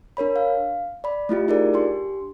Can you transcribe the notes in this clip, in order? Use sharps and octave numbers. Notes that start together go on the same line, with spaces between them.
D4 A#4 C#5 B5
F5
D5 B5
A3 E4 F4 G4
D#4 F4 G#4 A#4 D5
D4 G4 C6